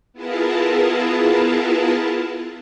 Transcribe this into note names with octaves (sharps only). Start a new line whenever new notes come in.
B3 E4 F4 G#4 A#4 A5